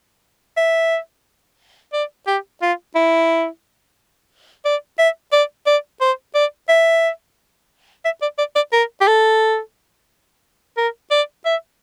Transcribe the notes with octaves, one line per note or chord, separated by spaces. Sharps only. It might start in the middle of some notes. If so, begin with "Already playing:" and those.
E5
D5
G4
F4
E4
D5
E5
D5
D5
C5
D5
E5
E5
D5
D5
D5
A#4
G4
A4
A#4
D5
E5